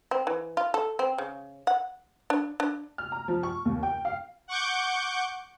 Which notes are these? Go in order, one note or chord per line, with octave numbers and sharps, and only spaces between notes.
C4
E3
F4
A4
C4
C#3
F#5
D4
D4
F6
A#5
F3
C#6
D#2
G5
F5
F#5 C#6 D6 G6